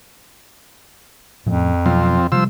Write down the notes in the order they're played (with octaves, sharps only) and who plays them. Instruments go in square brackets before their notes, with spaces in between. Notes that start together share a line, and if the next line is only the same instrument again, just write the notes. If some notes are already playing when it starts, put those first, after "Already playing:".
[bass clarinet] F2 [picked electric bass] A2 F3 C#4
[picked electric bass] B2 F#3 B3 [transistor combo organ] F3 C4
[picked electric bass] C3 G3 [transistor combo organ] F3 C5 E6